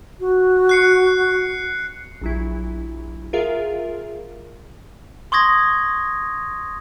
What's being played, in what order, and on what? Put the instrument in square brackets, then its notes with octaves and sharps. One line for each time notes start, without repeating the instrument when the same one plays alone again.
[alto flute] F#4
[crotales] F#6 C7 C#7
[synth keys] A#1 F#3 E4
F4 G#4 A#4 E5 F5
[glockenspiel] C6 C#6 D#6 G#6 A#6